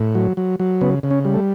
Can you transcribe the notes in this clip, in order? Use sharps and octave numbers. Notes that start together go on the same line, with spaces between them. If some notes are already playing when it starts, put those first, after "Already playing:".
Already playing: A2
F#3
F#3
F#3
C#3 B3
C#3
C#4
G3
A3